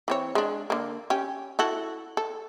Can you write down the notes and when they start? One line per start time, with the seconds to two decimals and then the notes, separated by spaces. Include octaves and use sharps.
0.08 E3 C4 C#5
0.35 G#3 D4
0.70 D3 A#3
1.10 C#4 G4
1.59 E4 F#4 A4
2.17 A4